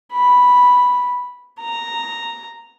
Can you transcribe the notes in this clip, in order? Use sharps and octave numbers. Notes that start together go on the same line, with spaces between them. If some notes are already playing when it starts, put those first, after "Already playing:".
B5
A#5